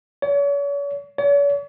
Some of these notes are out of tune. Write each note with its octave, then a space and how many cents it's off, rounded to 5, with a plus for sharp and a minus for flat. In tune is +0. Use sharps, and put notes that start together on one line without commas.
C#5 +40
C#5 +45